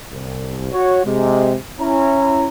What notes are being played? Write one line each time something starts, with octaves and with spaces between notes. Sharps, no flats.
C2
F#4 C#5
C3 G#3
C#4 E4 A#5